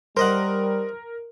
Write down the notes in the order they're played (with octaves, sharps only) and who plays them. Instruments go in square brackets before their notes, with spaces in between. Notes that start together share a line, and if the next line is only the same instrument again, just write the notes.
[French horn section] G3 [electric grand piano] A#4 [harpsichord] C5 D#5 F#5